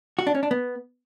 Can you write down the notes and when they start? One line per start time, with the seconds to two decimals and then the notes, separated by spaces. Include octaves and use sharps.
0.19 F#4
0.27 D4
0.35 C#4
0.43 D4
0.51 B3